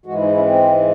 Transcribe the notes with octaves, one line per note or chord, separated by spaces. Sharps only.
G#2 E3 G#3 F#4
E4
D#4
E4
C#4
C4